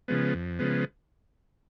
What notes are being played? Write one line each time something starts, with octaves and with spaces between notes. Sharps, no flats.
C#3 F3 G#3 B3
F2
C#3 F3 G#3 B3